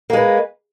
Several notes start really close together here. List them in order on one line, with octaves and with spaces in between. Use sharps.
A#3 G#3 B4